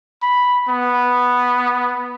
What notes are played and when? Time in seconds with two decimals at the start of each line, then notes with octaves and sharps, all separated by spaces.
0.22 B5
0.69 B3